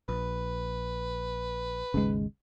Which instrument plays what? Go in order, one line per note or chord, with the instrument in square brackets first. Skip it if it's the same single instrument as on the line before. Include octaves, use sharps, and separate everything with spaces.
[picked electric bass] A#1 [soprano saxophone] B4
[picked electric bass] G#1 D#2 G#3 [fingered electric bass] G#2 C#3